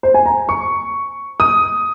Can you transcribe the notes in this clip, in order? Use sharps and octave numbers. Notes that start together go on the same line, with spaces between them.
C5
G#5
A#5
C#6
D#6